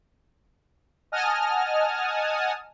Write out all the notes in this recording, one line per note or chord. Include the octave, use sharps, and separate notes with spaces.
D#5 F#5 G#5 A5 D#6 F6